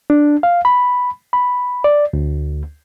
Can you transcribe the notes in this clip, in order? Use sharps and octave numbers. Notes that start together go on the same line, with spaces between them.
D4
F5
B5
B5
D5
D2